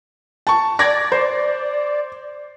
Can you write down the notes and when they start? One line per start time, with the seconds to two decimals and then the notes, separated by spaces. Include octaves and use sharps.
0.47 A5 C#6
0.79 D5 G#6 A#6
1.12 C5